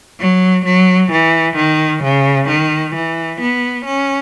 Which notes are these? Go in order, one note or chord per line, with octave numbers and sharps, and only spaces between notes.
F#3
F#3
E3
D#3
C#3
D#3
E3
B3
C#4